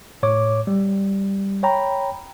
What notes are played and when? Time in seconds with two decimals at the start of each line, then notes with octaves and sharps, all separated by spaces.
0.23 A2 C#5 D6
0.67 G3
1.63 C#5 G5 A#5 B5